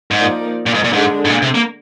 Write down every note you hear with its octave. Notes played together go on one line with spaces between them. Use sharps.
G#2
F3 A#3 D#4 A#4 D5
A#2
G#2
A#2
G#2 D3 G#3 D4
G#2
A#2
C3
A#3